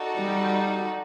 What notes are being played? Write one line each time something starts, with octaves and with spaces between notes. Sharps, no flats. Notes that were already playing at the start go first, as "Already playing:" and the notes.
Already playing: D#4 F#4 A4 D5
G3